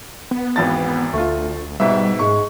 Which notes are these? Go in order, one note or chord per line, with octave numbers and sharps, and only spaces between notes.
B3
G#1 E2 A6
D2 A3 F4
G#2 B2 G3 E5
G#2 G#3 C#6